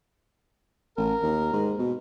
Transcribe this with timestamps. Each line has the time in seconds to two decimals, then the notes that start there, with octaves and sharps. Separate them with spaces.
0.97 A1 A#4
1.23 D#2
1.53 G#2
1.79 B2